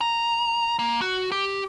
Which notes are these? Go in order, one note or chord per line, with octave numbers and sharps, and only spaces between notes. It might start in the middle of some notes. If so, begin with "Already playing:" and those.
A#5
A#3
F#4
G4